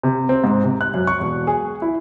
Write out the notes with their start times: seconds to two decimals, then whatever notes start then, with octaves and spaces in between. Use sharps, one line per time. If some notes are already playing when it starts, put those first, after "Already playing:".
0.03 C3
0.29 C4
0.44 G#2
0.64 C3
0.81 F#6
0.94 F#2
1.07 C#6
1.20 E1
1.47 G#4
1.82 E4